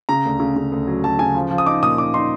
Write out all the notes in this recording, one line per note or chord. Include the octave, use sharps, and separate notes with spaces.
C#3 A#5
D2
C#3
C#3
D2
F#3
F#3 A5
C#3 G#5
F3
F3
D#6
D#4 D6
A#2 D#6
D#4 D6
D#4 C6